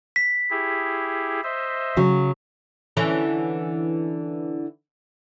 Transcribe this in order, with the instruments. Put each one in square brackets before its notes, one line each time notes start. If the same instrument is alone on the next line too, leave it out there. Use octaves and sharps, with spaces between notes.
[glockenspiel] B6
[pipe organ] E4 G4 G#4
C5 D#5 E5
[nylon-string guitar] C#3 F#3
[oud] D3 E3 C#4